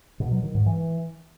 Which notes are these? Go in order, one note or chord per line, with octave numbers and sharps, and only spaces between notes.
B2
F#3
D#3
G#2
E3